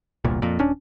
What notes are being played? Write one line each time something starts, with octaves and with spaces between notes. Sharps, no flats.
E1 C2 A#2
F2 A#2
D#1 C#4 D4